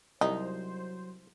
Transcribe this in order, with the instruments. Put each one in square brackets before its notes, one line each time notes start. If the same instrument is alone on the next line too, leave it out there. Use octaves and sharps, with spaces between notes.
[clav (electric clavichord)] C2 [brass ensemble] F#3 C5 [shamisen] D#4